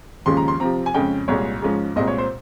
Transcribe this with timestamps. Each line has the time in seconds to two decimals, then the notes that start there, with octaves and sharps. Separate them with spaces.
0.26 D#2 C#3 F3 G#3 C#4 C6
0.37 A#5
0.48 C6
0.60 C3 F3 C4 A#5
0.86 G#5
0.94 F2 C#3 G#3 C#4 G5
1.28 C2 A#2 G#3 C#5
1.62 G#2 F3 G#3 C#4
1.96 C2 A#2 G#3 C4 D#5
2.07 C#5
2.18 C5